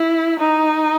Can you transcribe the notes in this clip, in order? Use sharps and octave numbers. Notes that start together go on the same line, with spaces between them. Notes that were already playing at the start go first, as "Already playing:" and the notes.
Already playing: E4
D#4